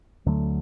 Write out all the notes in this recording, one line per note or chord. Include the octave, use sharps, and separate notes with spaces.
D2 D3 F#3 A3